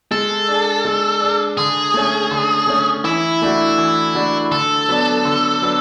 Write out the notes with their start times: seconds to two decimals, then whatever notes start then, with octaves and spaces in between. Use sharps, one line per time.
0.11 G#3 A4
0.48 D4 G#4
0.85 G#3
1.21 D4 G#4
1.57 D3 G#4
1.94 A3 C#4
2.31 D3
2.67 A3 C#4
3.04 E3 E4
3.42 A3 D4 F#4
3.77 E3
4.15 A3 D4 F#4
4.51 D3 A4
4.88 F#3 B3 D4
5.25 D3
5.62 F#3 B3 D4